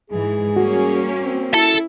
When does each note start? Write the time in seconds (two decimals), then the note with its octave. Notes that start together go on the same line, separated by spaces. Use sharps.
0.10 G#2 E3 G#4
0.56 G3 A#3 C#4 F#4
1.21 C4
1.54 E4 A4 A5